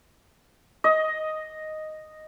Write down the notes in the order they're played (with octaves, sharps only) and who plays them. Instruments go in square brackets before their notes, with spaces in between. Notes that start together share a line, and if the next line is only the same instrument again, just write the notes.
[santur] D#5